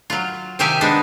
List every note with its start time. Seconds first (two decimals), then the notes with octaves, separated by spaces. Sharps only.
0.10 F#3 F4
0.59 C3 D#3 G4 E5 F5 G#5
0.81 G#3 B3 D4 D#4